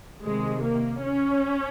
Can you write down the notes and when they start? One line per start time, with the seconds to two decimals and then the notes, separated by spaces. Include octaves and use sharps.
0.23 C3 D#3 G#3
0.63 A#3
1.03 C#4